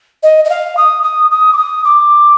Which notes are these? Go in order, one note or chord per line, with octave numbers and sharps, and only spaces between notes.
D#5
D#5
F5
D#6
D#6
D#6
D6
D#6
D6